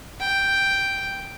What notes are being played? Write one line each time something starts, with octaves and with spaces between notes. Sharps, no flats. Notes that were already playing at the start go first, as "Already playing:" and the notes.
G5